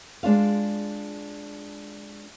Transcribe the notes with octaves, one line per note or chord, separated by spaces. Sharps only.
G#3 D4 F4 F5